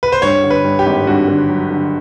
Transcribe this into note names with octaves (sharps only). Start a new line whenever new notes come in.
B4
C5
G2 C#5
D3
B4
G2
G4
G#1
G2 F#4
D3
F#3
D3